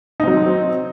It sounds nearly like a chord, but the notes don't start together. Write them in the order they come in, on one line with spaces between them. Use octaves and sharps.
D#4 C4 F#3